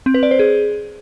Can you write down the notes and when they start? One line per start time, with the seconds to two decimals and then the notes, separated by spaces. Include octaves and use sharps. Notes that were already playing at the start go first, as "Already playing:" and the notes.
0.06 C4
0.14 B4
0.23 D5
0.31 C5
0.39 G#4